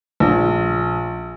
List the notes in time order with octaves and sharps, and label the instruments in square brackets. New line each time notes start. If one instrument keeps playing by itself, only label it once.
[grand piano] A#1